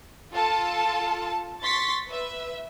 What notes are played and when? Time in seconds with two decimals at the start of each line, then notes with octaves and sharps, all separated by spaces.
0.33 F4 A4 A5
1.62 C6 C#6 A6 B6
2.08 B4 E5